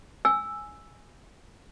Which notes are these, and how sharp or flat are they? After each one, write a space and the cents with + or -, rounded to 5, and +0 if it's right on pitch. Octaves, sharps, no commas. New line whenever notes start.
G#5 +0 E6 +0